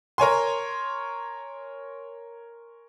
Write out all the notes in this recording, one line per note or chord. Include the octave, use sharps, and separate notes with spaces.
A#4 C#5 G#5 C6